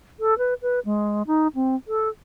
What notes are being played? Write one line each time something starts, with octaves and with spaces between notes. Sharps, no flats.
A4
B4
B4
G#3
D#4
C4
A4